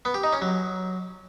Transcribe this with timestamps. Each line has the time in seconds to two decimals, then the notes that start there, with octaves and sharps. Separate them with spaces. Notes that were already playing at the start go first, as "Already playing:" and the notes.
0.05 B3
0.14 G4
0.23 D#4
0.33 C#4
0.42 F#3